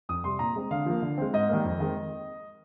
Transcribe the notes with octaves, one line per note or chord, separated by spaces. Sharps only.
F2 D#6
C3 G3 C6
A#2 A#5
G#3 C4
D3 F5
F3 A#3
D3
G#3 C4
G#2 D#5
D#3 G3 A#3
F2
D#3 G#3 C4